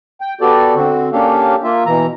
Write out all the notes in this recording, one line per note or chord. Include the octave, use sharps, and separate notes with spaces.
G5
B3 F#4 G4 A4 D5
D3 C4 F#4
A#3 C#4 D4 G4 A4 F5
A#3 F4 E5
B2 E3 A#5